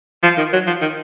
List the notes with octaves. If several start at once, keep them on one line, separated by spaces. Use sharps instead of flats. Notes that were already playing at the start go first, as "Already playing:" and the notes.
F3
D#3
F#3
F3
D#3